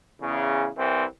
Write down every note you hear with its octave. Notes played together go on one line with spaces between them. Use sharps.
E2 C#3
C2 E3 C4